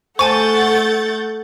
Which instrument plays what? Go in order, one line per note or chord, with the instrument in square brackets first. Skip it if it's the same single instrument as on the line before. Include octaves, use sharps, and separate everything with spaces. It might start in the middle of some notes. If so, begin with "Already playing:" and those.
[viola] A3 [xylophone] C5 G#5 A5 [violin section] F#5 G6 A6 [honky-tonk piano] C#6